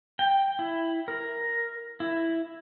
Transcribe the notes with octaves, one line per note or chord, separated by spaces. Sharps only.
G5
E4
A#4
E4